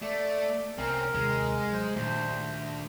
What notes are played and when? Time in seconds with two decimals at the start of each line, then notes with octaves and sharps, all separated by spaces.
0.02 A3 D5
0.78 C2 C4 C#4 A#4
1.14 D#2 C3 G#3
1.73 F#3 C5
1.96 D2 A#2 D#3